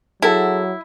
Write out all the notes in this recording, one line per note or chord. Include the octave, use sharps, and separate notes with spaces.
F#3 E4 G#4 A4 F#5